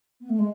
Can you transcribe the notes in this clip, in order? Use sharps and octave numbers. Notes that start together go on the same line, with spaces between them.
B3
A3
G#3